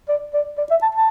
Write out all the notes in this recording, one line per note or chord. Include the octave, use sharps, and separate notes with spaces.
D5
D5
D5
E5
A5
A5